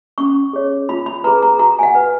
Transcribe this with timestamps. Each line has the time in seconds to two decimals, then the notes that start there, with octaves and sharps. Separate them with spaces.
0.18 C#4 C#6
0.53 G#4 C#5
0.89 F4 B5
1.06 B5
1.24 G#4 B4 A#5
1.42 A#5
1.59 F#4 A#5
1.79 G#5
1.83 F#5
1.95 B4